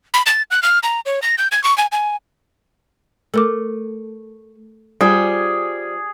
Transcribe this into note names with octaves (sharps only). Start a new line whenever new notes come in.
B5
A6
F#6
F6
A#5
C#5
A#6
G6
G#6
C#6
G#5
G#5
A3 A4 A#4 D6
G3 F4 G#4 C5